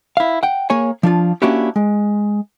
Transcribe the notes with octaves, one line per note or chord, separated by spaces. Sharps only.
E4 F5
F#5 G5
A#3 G#4 C#5 G#5
F3 D4 F4
A#3 C#4 D4 E4 F#4 G4
G#3